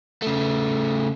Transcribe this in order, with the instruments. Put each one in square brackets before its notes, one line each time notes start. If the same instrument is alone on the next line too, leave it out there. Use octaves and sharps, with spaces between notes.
[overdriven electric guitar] C#3 A3